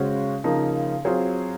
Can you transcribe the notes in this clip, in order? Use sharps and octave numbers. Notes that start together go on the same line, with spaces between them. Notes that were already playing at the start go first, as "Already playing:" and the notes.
Already playing: C#3 G#3 C#4 F#4 C5
C#3 F3 A#3 D#4
F#3 C4 F4 G#4 C5